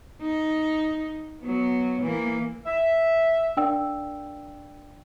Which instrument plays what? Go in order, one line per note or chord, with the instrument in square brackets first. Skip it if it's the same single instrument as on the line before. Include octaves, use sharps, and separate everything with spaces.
[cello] D#4
F#3 B3
E3 A#3
[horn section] E5
[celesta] D4 A#4 D5 F5 G5 E6